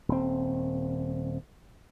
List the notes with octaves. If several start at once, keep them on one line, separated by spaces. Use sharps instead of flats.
D#1 C4